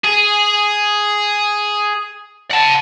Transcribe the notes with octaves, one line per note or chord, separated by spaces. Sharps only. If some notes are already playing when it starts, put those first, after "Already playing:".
G#4
F#5 A5